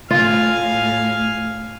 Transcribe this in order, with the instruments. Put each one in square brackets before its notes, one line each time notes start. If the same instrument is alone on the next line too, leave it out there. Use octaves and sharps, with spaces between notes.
[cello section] A2 [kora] F4 [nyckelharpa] F5 G#5